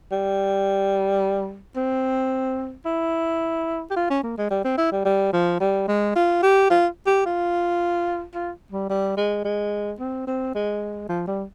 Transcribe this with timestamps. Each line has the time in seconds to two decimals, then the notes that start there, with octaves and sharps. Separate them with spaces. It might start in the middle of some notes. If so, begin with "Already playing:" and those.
0.11 G3
1.76 C4
2.85 E4
3.91 G4
3.96 F4
4.10 C#4
4.23 A#3
4.37 G#3
4.51 G3
4.64 C4
4.78 E4
4.91 G3
5.05 G3
5.33 F3
5.60 G3
5.88 G#3
6.16 F4
6.43 G4
6.70 F4
7.07 G4
7.26 F4
8.35 F4
8.72 G3
8.89 G3
9.17 G#3
9.44 G#3
10.00 C4
10.27 C4
10.55 G#3
11.09 F3
11.27 G3